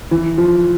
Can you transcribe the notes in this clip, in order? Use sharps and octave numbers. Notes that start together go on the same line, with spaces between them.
E3
F3